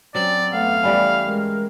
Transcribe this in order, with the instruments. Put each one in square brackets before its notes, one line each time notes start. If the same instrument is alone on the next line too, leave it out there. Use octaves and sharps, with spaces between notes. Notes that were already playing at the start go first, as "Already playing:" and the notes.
[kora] F#3 C4 [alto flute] C#4 [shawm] D5
[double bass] A3 B3 [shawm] F5 [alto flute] F#5
[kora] E3 G3 C#4 [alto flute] B5
[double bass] G#3 [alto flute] A#4